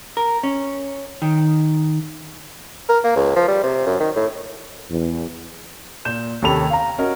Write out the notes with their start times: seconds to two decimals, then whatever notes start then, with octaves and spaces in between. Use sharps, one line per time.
0.17 A#4
0.43 C#4
1.22 D#3
2.89 A#4
3.04 A#3
3.16 C#2
3.36 F3
3.48 G3
3.63 C3
3.86 F#2
4.00 D#3
4.15 A2
4.90 E2
6.05 A#2 G6 E7
6.42 D#2 C3 C#4 A4 B5 F7
6.70 F5 A#5
6.98 C#4 F#4 A#4 D#5